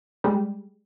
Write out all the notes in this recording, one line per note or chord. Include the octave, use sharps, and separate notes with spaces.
G3 G#3